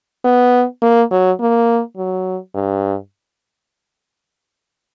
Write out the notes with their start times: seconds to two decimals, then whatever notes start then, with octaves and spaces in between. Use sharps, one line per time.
0.25 B3
0.82 A#3
1.11 F#3
1.41 A#3
1.97 F#3
2.55 G2